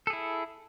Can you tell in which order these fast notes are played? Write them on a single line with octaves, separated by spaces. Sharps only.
A4 G#4 E4